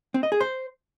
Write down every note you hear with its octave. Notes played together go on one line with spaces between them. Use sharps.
C4
D#5
G#4
C5